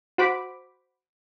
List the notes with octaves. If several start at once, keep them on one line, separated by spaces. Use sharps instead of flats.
F#4 C5 B5 D6